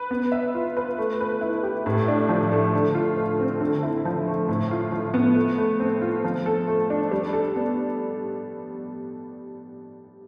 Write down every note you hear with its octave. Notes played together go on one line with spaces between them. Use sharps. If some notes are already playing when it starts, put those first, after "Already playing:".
Already playing: B4
B3
E5
F4
B4
A3
B4
E4
G4
A2
D4
F3
A3
D3
F4
A3
C4
D3
E4
F3
A3
A2
F4
F3
B3
A3
A3
C4
F4
F3
A4
A3
D4
G3
A4
B3